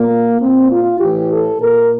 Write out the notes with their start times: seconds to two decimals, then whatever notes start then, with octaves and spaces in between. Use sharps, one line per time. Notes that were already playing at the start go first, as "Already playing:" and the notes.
Already playing: A#2 A#3
0.42 A#2 C4
0.71 F4
1.01 A2 E3 G4
1.31 A4
1.60 A#2 A#4